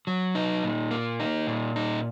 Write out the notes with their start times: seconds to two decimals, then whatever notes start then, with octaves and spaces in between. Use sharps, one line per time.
0.07 F#3
0.35 D#4
0.63 A#2
0.91 A#3
1.20 D#4
1.47 A#2
1.76 D#4